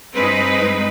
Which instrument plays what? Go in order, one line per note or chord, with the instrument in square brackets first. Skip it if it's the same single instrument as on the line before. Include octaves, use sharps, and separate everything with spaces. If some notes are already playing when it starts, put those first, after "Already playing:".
[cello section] G2 G#3 C4 D#4 B4